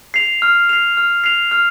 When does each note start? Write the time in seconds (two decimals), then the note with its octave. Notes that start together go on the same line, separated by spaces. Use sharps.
0.14 C7 F7
0.42 F6
0.69 C7 F7
0.97 F6
1.24 C7 F7
1.51 F6